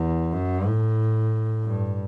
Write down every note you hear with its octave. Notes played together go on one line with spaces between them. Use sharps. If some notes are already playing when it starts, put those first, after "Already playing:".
Already playing: E2
F#2
A2
G2